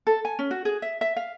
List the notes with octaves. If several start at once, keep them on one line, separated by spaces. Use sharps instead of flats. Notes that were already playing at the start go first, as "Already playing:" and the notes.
A4
G#5
C#4
F#4
G#4
E5
E5
F5